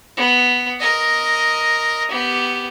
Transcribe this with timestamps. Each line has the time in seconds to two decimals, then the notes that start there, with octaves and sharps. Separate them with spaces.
0.17 B3
0.79 A#4 D#5
2.11 B3 G4